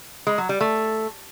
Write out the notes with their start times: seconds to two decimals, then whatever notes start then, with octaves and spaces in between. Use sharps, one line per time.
0.27 G#3
0.38 F#3
0.49 G3
0.61 A3